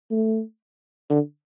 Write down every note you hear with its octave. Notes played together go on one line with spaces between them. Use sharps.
A3
D3